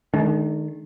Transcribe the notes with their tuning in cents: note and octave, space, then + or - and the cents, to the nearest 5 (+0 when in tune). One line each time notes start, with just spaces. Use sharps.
D#3 -10 G#3 +45 D4 +0